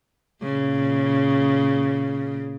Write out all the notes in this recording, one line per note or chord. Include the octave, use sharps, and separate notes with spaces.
A#2 C#3